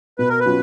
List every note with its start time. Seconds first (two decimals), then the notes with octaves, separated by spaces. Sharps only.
0.18 B2 B4
0.29 A#4
0.40 B4
0.45 F#3 C#4 F4